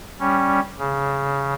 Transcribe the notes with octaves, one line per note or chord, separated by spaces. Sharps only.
G3 C#4
C#3